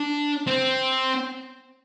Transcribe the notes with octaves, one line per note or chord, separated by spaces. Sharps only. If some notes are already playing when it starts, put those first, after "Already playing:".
Already playing: D4
C4